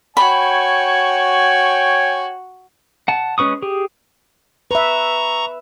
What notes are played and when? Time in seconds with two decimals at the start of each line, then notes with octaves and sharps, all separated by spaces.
0.17 F#4 C#5 G5 G#5 B5
3.08 F#5 A5
3.38 G#3 C#4 B4 C#6 D#6
3.62 G4 G#4
4.71 B4 E5 A#5 C#6